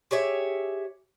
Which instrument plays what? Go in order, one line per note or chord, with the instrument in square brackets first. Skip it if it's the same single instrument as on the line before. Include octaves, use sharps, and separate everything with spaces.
[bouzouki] G4 G#4 C#5 E5